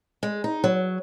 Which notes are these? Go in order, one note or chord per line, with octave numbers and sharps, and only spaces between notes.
G#3
D#4
F#3